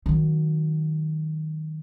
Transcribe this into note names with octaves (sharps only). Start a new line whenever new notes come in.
D#3 F#3